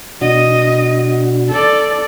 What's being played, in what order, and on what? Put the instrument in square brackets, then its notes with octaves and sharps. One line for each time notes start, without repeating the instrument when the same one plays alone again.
[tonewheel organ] B2 D4 F#4 [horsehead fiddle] D#5
[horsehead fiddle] A4 D5